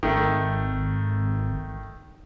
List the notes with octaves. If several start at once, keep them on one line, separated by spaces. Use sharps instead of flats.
G#1 D#3 A3